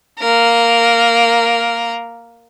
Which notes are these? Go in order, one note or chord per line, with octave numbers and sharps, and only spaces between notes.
A#3 A#4